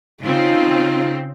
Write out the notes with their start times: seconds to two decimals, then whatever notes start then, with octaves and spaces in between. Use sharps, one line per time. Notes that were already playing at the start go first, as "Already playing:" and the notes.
0.23 C#3 C4 D#4 F4